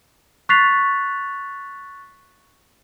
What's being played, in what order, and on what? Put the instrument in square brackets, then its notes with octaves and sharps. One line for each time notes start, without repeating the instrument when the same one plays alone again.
[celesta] C#6 F#6 A6 B6 C7 F7